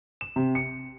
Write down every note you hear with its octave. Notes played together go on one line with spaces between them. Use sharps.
E7
C3
C#7